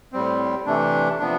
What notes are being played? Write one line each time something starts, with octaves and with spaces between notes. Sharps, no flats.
A2 G3 C4
C3 E3 A3 D4
C3 F3 B3 D4